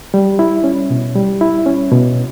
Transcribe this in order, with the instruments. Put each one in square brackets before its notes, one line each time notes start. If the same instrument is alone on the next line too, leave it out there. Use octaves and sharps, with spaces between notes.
[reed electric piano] G3
E4
C#4
B2
G3
E4
C#4
B2